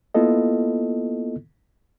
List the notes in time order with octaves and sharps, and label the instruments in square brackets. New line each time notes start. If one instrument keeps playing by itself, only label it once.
[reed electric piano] A#3 B3 E4 F4 A4 D#5